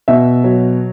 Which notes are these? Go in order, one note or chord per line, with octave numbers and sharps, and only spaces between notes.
B2 E5
F#3